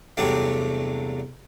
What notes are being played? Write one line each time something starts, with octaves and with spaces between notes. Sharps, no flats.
E2 G2 C3 F#3 A3 D4